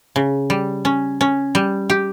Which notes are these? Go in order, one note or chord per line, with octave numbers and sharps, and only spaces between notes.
C#3
G3
C#4
C#4
G3
G4